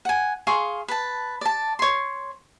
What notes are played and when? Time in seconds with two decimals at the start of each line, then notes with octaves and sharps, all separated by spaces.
0.05 F#5 G#5
0.47 G#4 F5 C6 C#6
0.88 B4 A5
1.41 D5 A5
1.79 C#5 C6